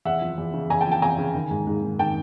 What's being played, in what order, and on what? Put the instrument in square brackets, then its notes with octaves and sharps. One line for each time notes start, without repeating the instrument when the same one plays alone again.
[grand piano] E2 E5 F#5
F3
E2
C#3
E2 G#5 A#5
G5 A5
F3
G5 A5
E2 G#5 A#5
C#3
D#3
G#2
G#2
D#3
D#3 G5 A5